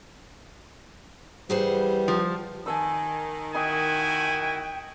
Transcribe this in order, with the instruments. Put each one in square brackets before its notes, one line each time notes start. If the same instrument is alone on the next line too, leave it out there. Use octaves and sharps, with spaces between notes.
[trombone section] E3 B4 [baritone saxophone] G3 [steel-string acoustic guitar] G#4 C5 F#5
[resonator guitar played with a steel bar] F3
[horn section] D#3 [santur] G#5 A5 E6
[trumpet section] E4 F#4 G#5 [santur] D#5 C#6 [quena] G5